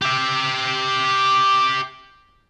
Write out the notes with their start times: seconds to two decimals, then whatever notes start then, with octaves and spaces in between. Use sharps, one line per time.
0.02 G4 E5